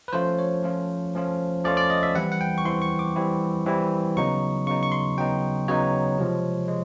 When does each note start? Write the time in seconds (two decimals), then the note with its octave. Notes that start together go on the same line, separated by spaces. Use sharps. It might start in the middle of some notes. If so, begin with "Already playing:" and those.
0.08 B4
0.13 F3 A3 C#4 F4 C5
0.39 C#5
0.63 F3 A3 C#4 F4
1.15 F3 A3 C#4 F4
1.64 F3 A3 C#4 F4 D5
1.77 D5
1.90 D#5
2.03 E5
2.14 E3 G3 C4 E4 F#5
2.32 F#5
2.41 G5
2.58 C#6
2.65 E3 G3 C4 E4 C6
2.82 C#6
2.99 D6
3.16 E3 G3 C4 E4
3.66 E3 G3 C4 E4
4.17 C#3 F#3 B3 D#4 C#6
4.67 C#3 F#3 B3 D#4 C#6
4.83 C#6
4.92 C6
5.18 C#3 F#3 B3 D#4 G5
5.68 C#3 F#3 B3 D#4 C#5
6.18 C3 F3 G#3
6.68 G#3